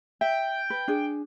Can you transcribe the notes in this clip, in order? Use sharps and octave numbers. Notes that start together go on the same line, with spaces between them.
E5 G5
B4
D4 G#4